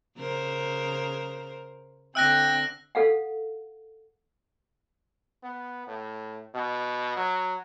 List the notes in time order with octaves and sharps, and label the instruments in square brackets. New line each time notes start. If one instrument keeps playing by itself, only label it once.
[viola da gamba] C#3 A#4 C5
[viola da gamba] D3 C4 [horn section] E5 G5 [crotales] E6 F#6 A#6
[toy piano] A4 F5 F#5
[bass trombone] B3
A2
B2
F#3